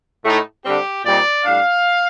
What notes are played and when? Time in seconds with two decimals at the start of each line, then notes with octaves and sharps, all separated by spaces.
0.24 A2 A3 D#4
0.63 D3 G3 C4 G4
1.04 A#2 G3 C4 D#4 D5
1.45 A2 G3 D4 F5